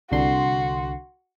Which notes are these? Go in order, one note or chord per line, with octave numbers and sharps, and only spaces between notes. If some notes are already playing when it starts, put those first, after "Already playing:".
C2 D3 F#4 C6